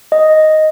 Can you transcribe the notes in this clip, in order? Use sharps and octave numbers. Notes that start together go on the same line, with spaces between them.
D#5